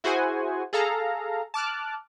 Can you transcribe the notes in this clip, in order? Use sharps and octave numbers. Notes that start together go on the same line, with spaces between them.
E4 F#4 G#4 C5 F#5 G#5
G#4 A4 F5 A#5
A5 D6 F6 F#6